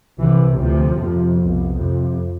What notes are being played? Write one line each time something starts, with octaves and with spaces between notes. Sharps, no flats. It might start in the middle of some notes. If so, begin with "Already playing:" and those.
C2 C3 E3
D2 C3 F3
F2 C3
C2 B2
F2 C3